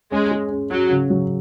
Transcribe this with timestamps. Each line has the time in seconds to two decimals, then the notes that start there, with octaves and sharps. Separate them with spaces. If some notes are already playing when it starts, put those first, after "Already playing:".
0.11 G#3 C#4
0.31 G#4
0.50 C#4
0.70 F#3 C#4
0.91 C#3
1.10 F#3